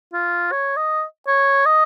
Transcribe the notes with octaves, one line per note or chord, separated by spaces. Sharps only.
F4
C#5
D#5
C#5
D#5